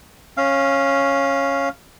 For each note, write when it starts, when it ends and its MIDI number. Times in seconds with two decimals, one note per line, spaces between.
0.37 1.69 61
0.37 1.69 77